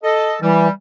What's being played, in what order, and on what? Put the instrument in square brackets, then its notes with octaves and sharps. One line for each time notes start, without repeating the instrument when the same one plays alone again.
[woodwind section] A4 D#5
[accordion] E3 [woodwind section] G3